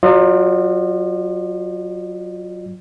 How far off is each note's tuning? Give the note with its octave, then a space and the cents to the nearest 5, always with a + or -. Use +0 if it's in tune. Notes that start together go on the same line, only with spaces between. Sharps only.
F#3 +0 F4 +20 D#5 -45